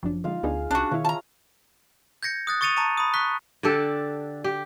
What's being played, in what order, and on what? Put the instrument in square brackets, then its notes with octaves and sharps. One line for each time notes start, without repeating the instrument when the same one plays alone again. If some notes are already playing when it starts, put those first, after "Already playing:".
[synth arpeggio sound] G1 F#2 D4 [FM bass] F3
[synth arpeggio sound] D3 G#3 [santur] D#4 F4 F5
[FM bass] D2 [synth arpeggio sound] B3 D4 D#4 [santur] G#4
[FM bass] C2 [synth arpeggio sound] C#4 [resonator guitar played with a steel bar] D4 F#4
[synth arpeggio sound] B2 E4 [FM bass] D#3 [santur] C#5 E5 F5
[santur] F4 E6 [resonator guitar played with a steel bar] A5 A#5
[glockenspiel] G6 G#6 A#6 C#7
D#6 F#6 A6
C#6 D#6 A6 C#7 D#7 F7
A5 A#5 C#6 D#7
B5 D#6
C#6 F#6 B6
[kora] D3 D4 G4 A4
G4